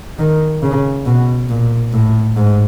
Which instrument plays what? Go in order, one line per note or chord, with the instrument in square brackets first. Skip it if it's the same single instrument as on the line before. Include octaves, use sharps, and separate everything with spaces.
[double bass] D#3
C#3
B2
A#2
A2
G#2